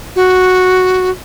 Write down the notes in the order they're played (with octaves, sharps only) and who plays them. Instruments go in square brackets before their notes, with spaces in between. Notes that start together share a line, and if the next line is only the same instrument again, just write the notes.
[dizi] F#4